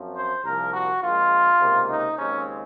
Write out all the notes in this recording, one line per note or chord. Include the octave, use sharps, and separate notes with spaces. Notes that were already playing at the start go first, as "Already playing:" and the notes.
Already playing: F#2 F3 C4
C5
C2 A#2 F3 A#4
F#4
A#1 A#2 G#3 F4
C#2 C3 D#3 A#3
D#4
D#2 C#3 G#3 C4 C#4